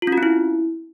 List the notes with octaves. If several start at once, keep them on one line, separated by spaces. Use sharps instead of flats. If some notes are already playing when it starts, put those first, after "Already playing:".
F4
C#4
F#4
C4
E4